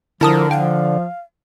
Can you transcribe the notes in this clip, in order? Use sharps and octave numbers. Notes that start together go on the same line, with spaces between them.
D3 F3 E4 A#4 A5 D#6
F3 F5 G5